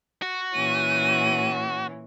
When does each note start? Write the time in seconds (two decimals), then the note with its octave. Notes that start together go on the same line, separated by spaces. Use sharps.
0.22 F#4
0.54 A#2 E3 C#4 D#7